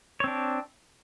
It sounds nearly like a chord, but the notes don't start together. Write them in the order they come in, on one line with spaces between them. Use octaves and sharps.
C#5 C4 D4